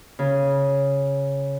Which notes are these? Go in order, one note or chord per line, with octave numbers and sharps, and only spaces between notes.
C#3